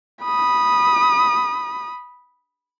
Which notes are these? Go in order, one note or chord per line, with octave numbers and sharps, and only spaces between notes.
B5 D#6